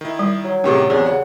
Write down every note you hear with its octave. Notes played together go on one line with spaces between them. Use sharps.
D#3 E4
G3
F#3
A2 C3 D#3 C#4 G4 G#4
E2 C4 G#4 C5 D5
C#3 F#5